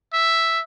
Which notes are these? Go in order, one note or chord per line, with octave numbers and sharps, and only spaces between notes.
E5